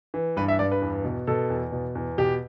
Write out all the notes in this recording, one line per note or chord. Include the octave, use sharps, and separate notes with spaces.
E3
G2 B4
E5
G2 D5
B4
E2
B2
B2 A4
E2
B2
E2
B2 G4